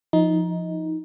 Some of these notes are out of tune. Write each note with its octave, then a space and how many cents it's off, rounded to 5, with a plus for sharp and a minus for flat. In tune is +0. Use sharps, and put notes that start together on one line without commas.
F3 -5 D#4 +15